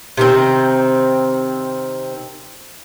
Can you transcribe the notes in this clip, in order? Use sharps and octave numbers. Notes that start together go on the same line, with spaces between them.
C3 D#3 C4